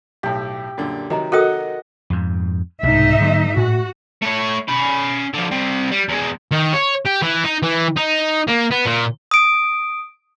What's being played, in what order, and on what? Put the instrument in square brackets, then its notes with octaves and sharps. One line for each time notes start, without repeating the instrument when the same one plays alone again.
[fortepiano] B1 A2 [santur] G4
[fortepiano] F#2 A#2 D3
[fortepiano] C3 D#3 F#3 [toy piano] B4 D#5 A#5
[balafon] F#4 A4 [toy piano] A#4 G5 D#6 [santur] D#5 F#5
[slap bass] F2 G#2
[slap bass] C2 B2 [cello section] G#2 D#4 E5
[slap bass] D3 F#3 A#3
[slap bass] A2 [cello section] F#4
[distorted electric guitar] A3 C#5
C#4 B5
D3 F3
G3 C4
G3
E2 G#3
D#3
C#5
G4
E3
D#4
E3
D#4
A#3
B3
A#2
[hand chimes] D#6 D7